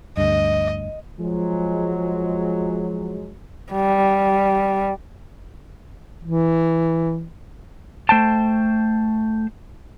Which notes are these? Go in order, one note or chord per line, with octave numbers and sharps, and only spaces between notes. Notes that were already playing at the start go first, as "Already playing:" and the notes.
D2 G2 D#5
F3 F#3 G#3
G3
E3
A3 C5 G5 A5